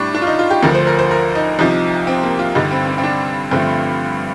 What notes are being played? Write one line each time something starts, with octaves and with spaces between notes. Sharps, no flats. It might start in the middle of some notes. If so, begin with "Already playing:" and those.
Already playing: A2 G3 D4
D4
F4
D#4
F4
G4
D2 D3 F3 A#4
C5
A#4
C5
A#4
D#4
C2 C3 F3 D#4
C4
A#3
F4
G2 D3 G3 D#4
C4
C4
C4
D4
G2 D3 F3 A3 C4